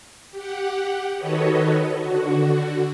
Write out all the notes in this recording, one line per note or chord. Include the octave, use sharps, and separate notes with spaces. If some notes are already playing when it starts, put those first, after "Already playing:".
G4 F#5
D#3 F#4 A4 B4 C#5 D#5
D3 F#4